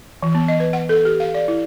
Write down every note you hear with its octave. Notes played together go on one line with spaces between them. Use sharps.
E3
B3
D#5
B4
F#5
A4
G4
F5
D5
E4